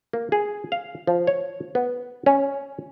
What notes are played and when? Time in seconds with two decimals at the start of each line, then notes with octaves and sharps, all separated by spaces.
0.13 A#3
0.32 G#4
0.72 F5
1.07 F3
1.27 C#5
1.75 B3
2.26 C#4